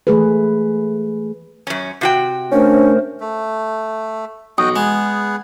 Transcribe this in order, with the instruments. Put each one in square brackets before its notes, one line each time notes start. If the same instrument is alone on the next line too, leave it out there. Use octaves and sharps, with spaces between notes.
[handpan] E3 A3 G#4 B4
[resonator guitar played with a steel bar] F#2 C#4
C3 F#4 G5
[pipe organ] A3 A#4 C5 [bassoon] C#4 [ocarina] D4
[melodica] A3
[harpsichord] B1 [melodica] F#4 D#5 G5 [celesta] D#6
[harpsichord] G#3 [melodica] B3 G#4